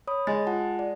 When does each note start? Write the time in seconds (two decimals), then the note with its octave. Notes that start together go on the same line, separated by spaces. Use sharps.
0.07 C#5 B5 D#6
0.27 G#3 A6
0.47 F4 F#5 A5
0.79 D5